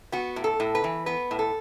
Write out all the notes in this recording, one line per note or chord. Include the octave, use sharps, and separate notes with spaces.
B3 F#4
A2
A4
A2
B4
E3
B3 B4
A2
A4